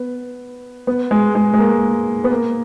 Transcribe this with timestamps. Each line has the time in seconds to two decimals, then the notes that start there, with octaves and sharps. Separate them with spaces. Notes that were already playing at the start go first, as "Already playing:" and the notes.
Already playing: B3
0.87 B3
1.11 G#3
1.35 G#3
1.54 G#3
1.58 A#3
2.24 B3
2.31 A#3